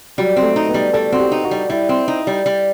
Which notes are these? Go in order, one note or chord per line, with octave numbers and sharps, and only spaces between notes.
F#3 G3
C4
A3
D#4
B3
G3
G3 A4
C4 F#4
G4
D#4
F#4
G3
G3 E4
C4
D#4
G3
G3